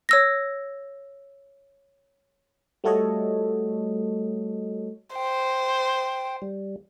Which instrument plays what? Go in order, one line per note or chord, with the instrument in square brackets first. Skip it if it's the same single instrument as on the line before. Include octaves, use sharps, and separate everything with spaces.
[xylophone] C#5 E6 A#6
[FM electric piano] G3 A3 F#4 A4 C#5 D#5
[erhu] C5 [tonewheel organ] G5
[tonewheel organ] G3